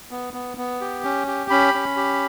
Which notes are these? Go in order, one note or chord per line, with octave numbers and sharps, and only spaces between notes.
B3
B3
B3
G4
C#4
G4
C#4 B5
C#4
G4